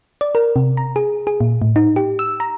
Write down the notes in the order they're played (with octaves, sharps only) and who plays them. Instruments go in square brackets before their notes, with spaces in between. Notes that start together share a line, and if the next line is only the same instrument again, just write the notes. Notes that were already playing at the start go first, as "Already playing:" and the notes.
[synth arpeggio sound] D5
A#4
C3
A#5
G#4
G#4
A#2
A2
D#4
G4
E6
A#5